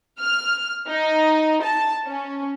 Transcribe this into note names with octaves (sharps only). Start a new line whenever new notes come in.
F6
D#4
A5
C#4